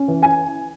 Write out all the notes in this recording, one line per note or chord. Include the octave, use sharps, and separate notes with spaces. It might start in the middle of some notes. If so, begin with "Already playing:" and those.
Already playing: C#4
E3
G#5